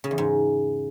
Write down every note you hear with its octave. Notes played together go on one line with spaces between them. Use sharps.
C#3
E2
G#2